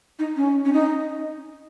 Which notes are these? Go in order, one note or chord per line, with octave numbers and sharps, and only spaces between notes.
D#4
C#4
C#4
D#4